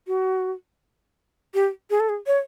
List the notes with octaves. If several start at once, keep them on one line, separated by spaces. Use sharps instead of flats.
F#4
G4
G#4
A4
G#4
C#5